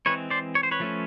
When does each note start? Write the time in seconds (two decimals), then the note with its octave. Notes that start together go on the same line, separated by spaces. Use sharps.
0.06 E3 G#3 C4 B4 C#5
0.30 C5 D5
0.55 C#5
0.63 C5
0.71 B4 C#5
0.80 F3 A3 C#4